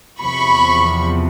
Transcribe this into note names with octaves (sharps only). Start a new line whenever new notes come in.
E2 C3 F3 B5 C#6